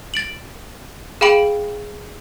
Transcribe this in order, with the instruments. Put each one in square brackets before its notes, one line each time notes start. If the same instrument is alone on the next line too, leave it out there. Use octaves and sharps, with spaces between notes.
[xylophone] A6 D7 F#7
G#4 F5 G5 B5 D7 F#7